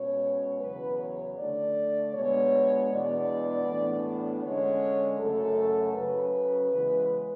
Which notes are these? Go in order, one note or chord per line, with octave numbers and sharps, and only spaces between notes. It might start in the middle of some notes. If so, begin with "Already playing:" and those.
Already playing: B2 G#3 C#4 C#5
E2 C#3 F#3 B4
C#5
D3 A3 D4 D5
B2 G#3 B3 D4 C#5
E2 B2 G#3 B3 D4 D5
A2 E3 B3 D4
D3 G#3 C#4 C#5
F#2 C#3 F#3 A3 A4
C#3 F#3 C#4 B4
E2 C#3 E3 G#3